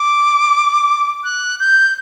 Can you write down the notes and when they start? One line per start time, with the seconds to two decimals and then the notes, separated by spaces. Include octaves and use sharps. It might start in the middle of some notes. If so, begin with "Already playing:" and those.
Already playing: D6
1.24 F#6
1.60 G6